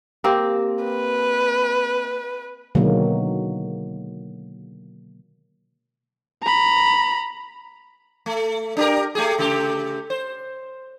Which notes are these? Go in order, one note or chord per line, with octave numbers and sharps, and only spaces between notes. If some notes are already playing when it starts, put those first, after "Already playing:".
A#3 C4 G4
B4
B2 D3 D#3 F#3 G#3 A#3
A#5 B5
A3
D4 G4 A#4
A3 G4 G#4
C#3 A3 G4
C5